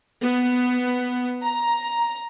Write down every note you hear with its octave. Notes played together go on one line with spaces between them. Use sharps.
B3
A#5